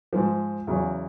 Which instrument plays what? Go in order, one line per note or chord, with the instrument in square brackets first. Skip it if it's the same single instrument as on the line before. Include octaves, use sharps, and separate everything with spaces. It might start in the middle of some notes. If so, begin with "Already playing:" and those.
[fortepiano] G#2 F3
E2 C#3 F#3